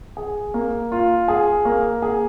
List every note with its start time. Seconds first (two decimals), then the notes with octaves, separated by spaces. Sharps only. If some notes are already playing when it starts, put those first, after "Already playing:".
0.17 G#4
0.54 A#3
0.92 F4
1.28 G#4
1.65 A#3
2.02 G#4